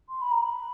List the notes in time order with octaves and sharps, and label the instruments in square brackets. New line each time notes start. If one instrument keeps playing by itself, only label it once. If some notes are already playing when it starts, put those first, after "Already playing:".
[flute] C6
B5
A#5
B5